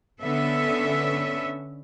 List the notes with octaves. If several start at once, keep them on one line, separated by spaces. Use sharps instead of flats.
D3 B3 C#4 A4 E5